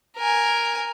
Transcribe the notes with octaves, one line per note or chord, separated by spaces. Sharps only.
A#4 G#5